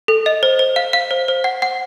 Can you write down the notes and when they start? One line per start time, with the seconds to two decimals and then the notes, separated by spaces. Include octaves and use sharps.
0.08 A4
0.26 D#5
0.43 C5
0.59 C5
0.76 F5
0.93 F5
1.11 C5
1.28 C5
1.44 F#5
1.62 F#5